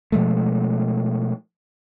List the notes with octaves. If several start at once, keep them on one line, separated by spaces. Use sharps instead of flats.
B2 F3 G#3 A3